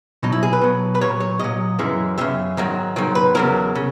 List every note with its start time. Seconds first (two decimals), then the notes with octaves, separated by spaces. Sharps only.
0.23 B2 F#3 D#4
0.32 E4
0.43 G#4
0.53 B4
0.61 B2 F#3
0.95 B4
1.01 A#2 F#3 C#5
1.20 C#5
1.39 A#2 F#3 D#5
1.79 F#2 C#3 E3 G#3
2.18 F#2 C#3 E3 G#3 E5
2.57 G#2 D#3 F#3
2.96 G#2 D#3 F#3
3.15 B4
3.35 E2 C#3 F#3 A#4
3.75 C#3